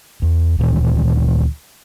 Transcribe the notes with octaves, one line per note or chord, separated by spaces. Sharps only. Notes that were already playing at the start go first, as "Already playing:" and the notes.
E2
D2 A#2 D#3 E3